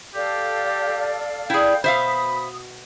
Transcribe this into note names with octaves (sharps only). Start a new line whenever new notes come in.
G4 A4 D5 F5
A#3 D4 E4 G#4 G5
B2 F#4 C5 E5 F5 B5 D#6